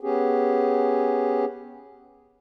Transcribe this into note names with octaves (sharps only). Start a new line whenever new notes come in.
B3 C#4 G4 G#4